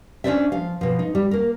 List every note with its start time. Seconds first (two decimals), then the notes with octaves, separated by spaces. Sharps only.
0.24 C#4 D4 F4 C5 D5 E5
0.52 F3 F5
0.81 B2 F3
0.99 D#4
1.15 G3
1.31 A#3 A#4